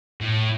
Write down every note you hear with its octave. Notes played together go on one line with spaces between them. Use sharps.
A2